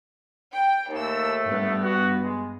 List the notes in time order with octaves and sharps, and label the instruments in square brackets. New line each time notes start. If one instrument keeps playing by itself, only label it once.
[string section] G5
[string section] D#2 E6 [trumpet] A3
[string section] G2 B3
[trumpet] F#4
G#3